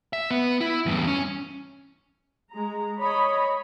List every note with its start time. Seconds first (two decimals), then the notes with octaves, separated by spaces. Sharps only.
0.13 E5
0.30 B3
0.61 E4
0.86 E2 G2
1.07 C#4
2.53 G#3 A#5
3.01 C#5 D#5 B5